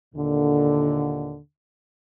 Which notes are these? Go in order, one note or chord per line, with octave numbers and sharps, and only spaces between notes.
D#2 A#2 D3